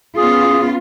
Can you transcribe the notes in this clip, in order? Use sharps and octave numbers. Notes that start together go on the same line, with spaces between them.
B3 C#4 F4 G#4